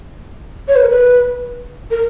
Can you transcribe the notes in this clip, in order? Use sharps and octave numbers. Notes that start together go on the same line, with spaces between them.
C#5
B4
A#4
B4
A#4